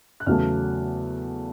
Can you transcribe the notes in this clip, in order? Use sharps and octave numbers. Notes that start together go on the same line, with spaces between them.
F#6
E2 C#3 F#3 A3 F6